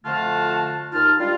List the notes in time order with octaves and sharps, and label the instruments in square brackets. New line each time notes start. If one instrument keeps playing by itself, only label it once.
[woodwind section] F2 D3 A3 F4 F#4 A5
D#2 D#4 F4 A5 F6
G3 G#3 D4 F4